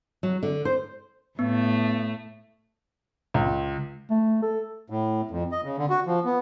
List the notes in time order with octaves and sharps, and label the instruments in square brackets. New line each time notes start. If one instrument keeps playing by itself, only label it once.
[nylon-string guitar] F#3
D3
C5
[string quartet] A2 A3 [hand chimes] B3
[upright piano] C#2
[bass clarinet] A3
A4
[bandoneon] A2
F2
D#5
C#3
D3
F#4
F3
B3